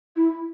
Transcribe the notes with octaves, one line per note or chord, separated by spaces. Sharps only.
E4